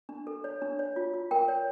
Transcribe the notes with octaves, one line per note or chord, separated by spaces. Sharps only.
D4
A4
C#5
D4
C#5
F4
F4
A#4 G5
C#5